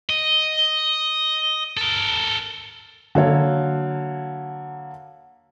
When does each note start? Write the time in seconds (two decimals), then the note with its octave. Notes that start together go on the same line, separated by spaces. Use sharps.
0.10 D#5
1.77 A4 A#4
3.15 D3 F#3 A#3 A4 C#5